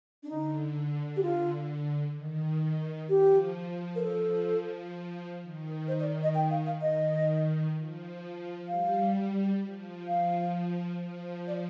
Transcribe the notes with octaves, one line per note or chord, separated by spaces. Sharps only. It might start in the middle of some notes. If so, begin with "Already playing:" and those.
D4
D3 D#4
G4
F4
D#3
F3 G4
A#4
F3 A4
D#3
C5
D5
D#5
G5
F5
F5
D#3 D#5
F3
G3 F5
F3
F3 F5
F3
D5